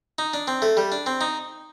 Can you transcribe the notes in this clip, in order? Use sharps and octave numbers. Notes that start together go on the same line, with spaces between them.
D#4
D4
C4
A3
G3
D4
C4
D#4